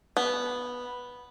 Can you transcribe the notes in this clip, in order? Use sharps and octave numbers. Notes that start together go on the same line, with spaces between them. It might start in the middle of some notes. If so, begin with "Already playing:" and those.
B3